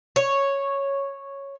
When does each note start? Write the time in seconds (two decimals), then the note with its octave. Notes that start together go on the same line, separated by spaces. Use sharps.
0.16 C#5